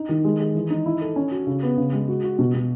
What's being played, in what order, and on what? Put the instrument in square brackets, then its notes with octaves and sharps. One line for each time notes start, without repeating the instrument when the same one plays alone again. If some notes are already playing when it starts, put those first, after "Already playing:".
Already playing: [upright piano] D#4
D#3
G#3
G#4
E3
D#4
E4
A4
C#4
F#4
C#3
B3
C#3
G#3
F#4
F#4
B2
B2